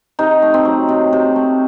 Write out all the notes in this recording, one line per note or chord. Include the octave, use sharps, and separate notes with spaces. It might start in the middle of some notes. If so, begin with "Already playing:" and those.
C3 D#4
A3
C4
F#3
C3
C3
A3